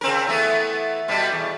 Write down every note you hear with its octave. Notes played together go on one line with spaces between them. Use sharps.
C#3 C4 A#4
E3 A3 B3
B2 G3 B3
E2